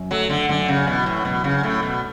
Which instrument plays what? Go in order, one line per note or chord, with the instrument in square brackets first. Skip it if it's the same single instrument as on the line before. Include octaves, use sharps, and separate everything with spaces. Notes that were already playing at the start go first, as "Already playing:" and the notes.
Already playing: [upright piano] F#2
[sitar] F#3 [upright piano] A3
[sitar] D3
[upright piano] F#2 [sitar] D3
[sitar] C#3
[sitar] B2 [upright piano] E3
[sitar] A2
[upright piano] F#2 [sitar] B2
[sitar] C#3
[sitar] A2 [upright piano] A3
[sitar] B2